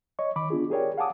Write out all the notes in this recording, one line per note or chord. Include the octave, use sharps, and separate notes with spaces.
C#5 D#5 C#6
D#3 B5 D6
B3 D4 F4 G#4
G4 G#4 A#4 C#5 D5 G5
F5 F#5 G#5 A5 D6 D#6